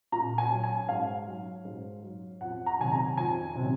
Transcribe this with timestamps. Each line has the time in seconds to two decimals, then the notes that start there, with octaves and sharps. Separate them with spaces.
0.12 A#2 A#5
0.38 G#5
0.50 F#3
0.64 G#5
0.89 G#2 F5
1.27 F#3
1.65 G#2
2.03 F#3
2.41 F2 F#5
2.66 A#5
2.79 C3 D#3 F#3 G#5
2.92 A#5
3.17 F2 G#5
3.55 C3 D#3 F#3